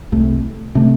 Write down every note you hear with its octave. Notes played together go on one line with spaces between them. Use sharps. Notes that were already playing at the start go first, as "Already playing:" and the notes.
C2 C3 A3
C3 A3